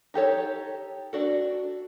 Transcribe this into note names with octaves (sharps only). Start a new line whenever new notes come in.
D#4 G4 A4 C#5
D4 F#4 A4